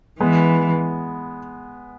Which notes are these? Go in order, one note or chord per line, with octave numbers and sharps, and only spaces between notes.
E3 G#3 B3